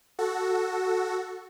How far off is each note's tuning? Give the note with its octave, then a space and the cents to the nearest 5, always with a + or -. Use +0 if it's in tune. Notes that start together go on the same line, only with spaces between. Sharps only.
F#4 +0 A4 +0